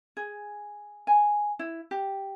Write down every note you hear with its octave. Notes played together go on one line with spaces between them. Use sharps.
G#4
G#5
E4
G4